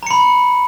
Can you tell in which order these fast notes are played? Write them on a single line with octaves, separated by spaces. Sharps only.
A#5 C#7 B5